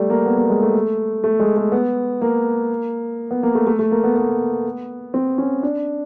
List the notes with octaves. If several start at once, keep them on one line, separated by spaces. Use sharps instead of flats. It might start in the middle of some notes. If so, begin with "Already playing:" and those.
Already playing: G3 A3
A#3
B3
A#3
G#3
A3
A3
G#3
A3
B3
A#3
B3
A#3
A3
A3
A3
A#3
B3
B3
C4
C#4
D4